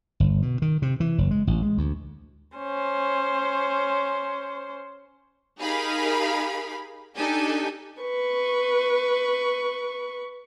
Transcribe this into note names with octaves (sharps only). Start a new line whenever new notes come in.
G1
B2
D#3
C3
E3
F#1
G#3
A1
G#3
D2
C#4 C5
D#4 G4 G#4 A#4 F5 B5
D4 D#4 G4 A4 G#5
B4 C#6